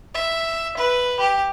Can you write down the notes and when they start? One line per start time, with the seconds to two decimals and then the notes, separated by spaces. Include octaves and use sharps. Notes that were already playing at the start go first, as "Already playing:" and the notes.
0.14 E5
0.77 B4
1.19 G4